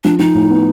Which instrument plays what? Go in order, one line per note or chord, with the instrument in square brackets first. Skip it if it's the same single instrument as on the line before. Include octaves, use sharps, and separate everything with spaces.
[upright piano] F3 [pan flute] D4
[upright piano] F3 [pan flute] D#4
[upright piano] A2
B3